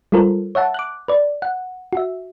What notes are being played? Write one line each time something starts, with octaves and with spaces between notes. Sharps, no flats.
G3 G#3 F4 A4 A#4 C5
C#5 E5 F#5 A5
D6 F#6
B4 D5
F#5
F#4 E5